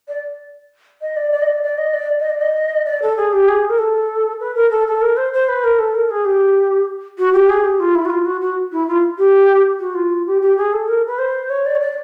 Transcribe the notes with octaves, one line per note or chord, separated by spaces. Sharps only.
D5
D#5
D5
D5
D#5
D5
D5
D#5
D5
D#5
D5
D#5
D5
A4
G#4
G4
G#4
A#4
A4
B4
A#4
A4
A4
A#4
C5
C5
B4
A#4
A4
A#4
G#4
G4
F#4
G4
G#4
G4
F4
E4
F#4
F4
F#4
F#4
E4
F4
G4
F#4
F4
G4
G4
G#4
A4
A#4
B4
C5
C#5
D5
C#5
D5